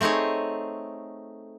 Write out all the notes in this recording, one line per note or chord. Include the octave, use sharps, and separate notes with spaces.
A3 C4 D#4 G#4 C#5